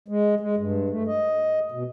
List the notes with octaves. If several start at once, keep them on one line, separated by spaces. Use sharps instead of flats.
G#3
G#3
G2
A3
D#5
B2